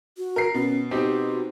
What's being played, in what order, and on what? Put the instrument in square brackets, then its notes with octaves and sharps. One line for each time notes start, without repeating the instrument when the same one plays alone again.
[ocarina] F#4
[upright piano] A#4 C7
[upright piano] B2 [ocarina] C#4
[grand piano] C4 D#4 G4 [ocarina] F#4